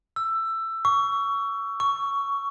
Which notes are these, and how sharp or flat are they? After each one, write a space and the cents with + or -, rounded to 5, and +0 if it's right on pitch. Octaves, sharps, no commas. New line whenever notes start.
E6 +15
C#6 +20
C#6 +10